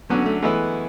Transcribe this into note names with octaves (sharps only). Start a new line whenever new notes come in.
D3 F#3 B3 C#4 F#4
A3
E3 G#3 A3 B3 E4